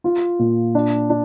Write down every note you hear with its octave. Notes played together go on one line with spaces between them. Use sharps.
F4
A#2
D4
D4